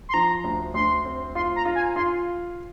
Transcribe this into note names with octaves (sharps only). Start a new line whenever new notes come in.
C6
F3 A#5
D2
D2 C6
C4
F4 C6
A#5
F4
G#5
F4 C6